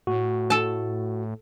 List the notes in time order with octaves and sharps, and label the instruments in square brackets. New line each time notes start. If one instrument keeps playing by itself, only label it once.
[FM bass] A2 [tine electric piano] F#4
[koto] A4 A5